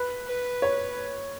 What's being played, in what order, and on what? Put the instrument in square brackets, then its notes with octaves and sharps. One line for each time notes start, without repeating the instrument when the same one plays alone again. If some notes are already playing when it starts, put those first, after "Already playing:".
Already playing: [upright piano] B4
[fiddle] B4
[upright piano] C#5